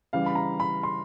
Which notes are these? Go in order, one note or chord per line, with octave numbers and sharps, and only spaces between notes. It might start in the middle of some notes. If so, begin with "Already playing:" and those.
C#3 E3 G3 F5
B5
A#5
B5
C6